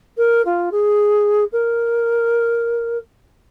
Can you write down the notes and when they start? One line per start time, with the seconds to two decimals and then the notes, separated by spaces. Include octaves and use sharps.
0.17 A#4
0.45 F4
0.71 G#4
1.52 A#4